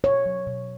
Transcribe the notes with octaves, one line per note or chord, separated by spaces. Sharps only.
B2 C#5
F#3
B2